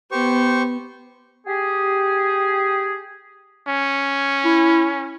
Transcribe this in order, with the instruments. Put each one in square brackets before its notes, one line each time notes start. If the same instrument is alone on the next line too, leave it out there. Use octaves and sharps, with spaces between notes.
[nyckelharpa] B3 [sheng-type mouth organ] G4 C5 C#6
[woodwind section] G4 G#4
[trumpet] C#4
[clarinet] E4